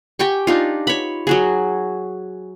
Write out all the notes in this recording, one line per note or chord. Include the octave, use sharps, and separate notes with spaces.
G4 G5 G#5 C#6
D4 D#4 F4
C#5 B5
F#3 F#4 G#4